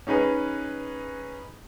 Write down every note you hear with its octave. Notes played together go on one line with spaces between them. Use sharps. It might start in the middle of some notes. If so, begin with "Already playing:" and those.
C#4 D#4 G#4 B4